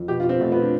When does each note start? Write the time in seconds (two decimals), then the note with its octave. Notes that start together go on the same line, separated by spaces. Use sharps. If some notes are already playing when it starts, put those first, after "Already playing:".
Already playing: F2
0.08 B2 G4
0.20 F4
0.24 B2 C4
0.40 B2 A3
0.52 B3
0.56 B2
0.62 D4